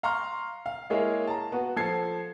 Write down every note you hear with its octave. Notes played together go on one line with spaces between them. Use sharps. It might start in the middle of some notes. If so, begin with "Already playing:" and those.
F5 A#5 C6 C#6 F6
F5
G#3 A#3 E4 G#4 C#5 F5
A5 A#5
B3 F#4
F3 A4 G#6 C7